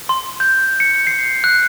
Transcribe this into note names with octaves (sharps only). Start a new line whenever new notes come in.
C6
G6
C#7
C7
F#6